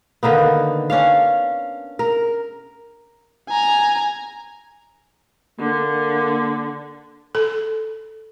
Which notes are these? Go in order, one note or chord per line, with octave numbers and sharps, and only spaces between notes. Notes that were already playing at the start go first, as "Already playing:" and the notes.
D3 D#3 A#3 B3
C#4 D4 F5
A#4
G#5 A#5
D3 A#3
A4